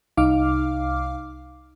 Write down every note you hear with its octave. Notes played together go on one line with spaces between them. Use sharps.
C2 D#4 F5 D6 F6